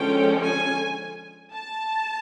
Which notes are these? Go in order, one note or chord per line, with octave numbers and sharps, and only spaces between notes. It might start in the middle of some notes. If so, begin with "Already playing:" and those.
Already playing: D3 F3 G#3 C#4 G5
G#5
A5